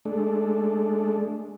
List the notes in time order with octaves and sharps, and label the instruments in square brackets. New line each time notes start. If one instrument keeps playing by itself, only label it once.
[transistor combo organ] G#3 A3 D4